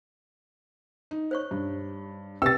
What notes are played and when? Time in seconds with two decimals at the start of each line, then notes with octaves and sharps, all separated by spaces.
1.11 D#4
1.31 C5 C#5 C#6
1.51 G2
2.42 C3 B4 G5 E6 A6